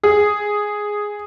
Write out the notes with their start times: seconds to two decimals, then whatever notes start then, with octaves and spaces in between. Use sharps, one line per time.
0.04 G#4